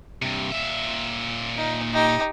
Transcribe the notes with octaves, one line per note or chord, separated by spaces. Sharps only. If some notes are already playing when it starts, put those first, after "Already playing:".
G2 C3
A#2 E5
D#4
D#4 G4